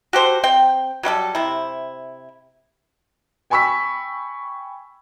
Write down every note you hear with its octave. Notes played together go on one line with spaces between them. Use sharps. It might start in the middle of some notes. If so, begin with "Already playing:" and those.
F#4 G4 A4 C5
C4 G5
F#3 G3 F4 A4
C3 E4
G5 G#5 B5 C#6 E6 B6